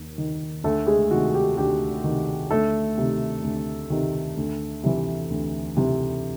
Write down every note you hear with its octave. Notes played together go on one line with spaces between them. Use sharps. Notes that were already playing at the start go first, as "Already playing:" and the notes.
Already playing: D#2
D#3
D2 A3 A4
G#3 G#4
C3 D#3 F#4
G4
D2 G4
C3 D#3
D2 A3 A4
C3 D#3
D2
C3 D#3
D2
C3 E3
D2
C3 E3